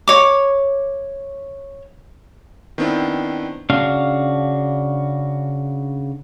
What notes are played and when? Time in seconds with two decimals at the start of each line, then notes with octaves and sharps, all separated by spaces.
0.08 C#5 D6
2.78 D#3 B3 C4 D4 E4
3.70 C#3 D4 F#4 F5